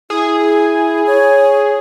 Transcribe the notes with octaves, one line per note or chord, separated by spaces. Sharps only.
E4 G#4
C#5